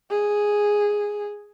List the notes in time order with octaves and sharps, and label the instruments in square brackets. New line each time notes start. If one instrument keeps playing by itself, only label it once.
[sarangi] G#4